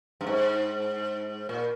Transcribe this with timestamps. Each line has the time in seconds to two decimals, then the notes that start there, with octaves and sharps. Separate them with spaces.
0.21 G2
0.27 G#2
1.49 A#2